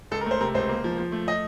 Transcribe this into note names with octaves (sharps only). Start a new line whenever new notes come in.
C#2 A4
A#4
A3 C5
C3 A#4
C#2 C5
A#3
F3
F3
A3
D#5